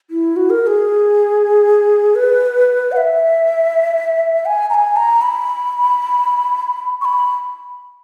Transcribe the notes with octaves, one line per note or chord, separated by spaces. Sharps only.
E4
F#4
A#4
A#4
G#4
B4
F#5
E5
G#5
A#5
G#5
A#5
B5
C#6
B5